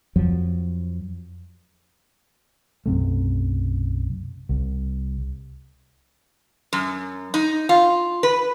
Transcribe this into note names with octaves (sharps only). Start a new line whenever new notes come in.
F2 F3 F#3
B1 F#2 C3 A3
C2
F#2
D#4
F4
B4